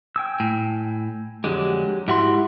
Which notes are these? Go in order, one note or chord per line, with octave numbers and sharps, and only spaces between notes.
G5 G#5 E6
A2
F2 D3 F#3 G#3 G4
G#2 E4 F#4 G4 E5 C6